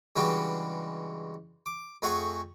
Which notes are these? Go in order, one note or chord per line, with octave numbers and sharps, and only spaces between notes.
G2 C#3 E3 G#3 F#4 G4
D6
F2 A3 G#4 F#5 A#5 C#6